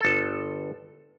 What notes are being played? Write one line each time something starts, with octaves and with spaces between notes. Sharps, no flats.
G1 A4